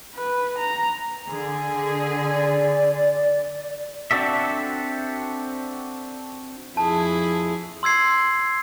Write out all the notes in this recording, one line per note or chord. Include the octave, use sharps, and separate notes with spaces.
B4
A#5
D3 G#4
D5
C4 D4 F#4 A4 E5
F2 E4 G#4 A5
C6 E6 G#6 C7